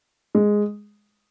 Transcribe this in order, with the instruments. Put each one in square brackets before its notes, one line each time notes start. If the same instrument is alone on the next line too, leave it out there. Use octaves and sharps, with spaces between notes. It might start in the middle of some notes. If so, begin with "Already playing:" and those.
[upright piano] G#3